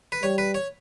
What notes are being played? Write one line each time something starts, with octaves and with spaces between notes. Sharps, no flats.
B4
G3 C#5
B4
C#5